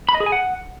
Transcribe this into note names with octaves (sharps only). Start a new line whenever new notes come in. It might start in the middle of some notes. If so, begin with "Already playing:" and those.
B5
D#5
G#4
G#5
F#5